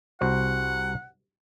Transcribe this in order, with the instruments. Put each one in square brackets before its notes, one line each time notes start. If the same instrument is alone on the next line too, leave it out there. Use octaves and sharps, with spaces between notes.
[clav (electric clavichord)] C2 F#4 C5 [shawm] F#5